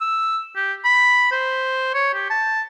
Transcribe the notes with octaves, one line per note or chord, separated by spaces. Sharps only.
E6
G4
B5
C5
C#5
G4
A5